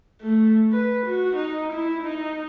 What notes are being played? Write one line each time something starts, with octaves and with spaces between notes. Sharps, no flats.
A3
B4
F#4
D#4
E4
D#4